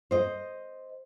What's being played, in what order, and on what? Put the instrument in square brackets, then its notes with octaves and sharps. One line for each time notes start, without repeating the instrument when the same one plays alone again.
[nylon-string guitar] C5 D#5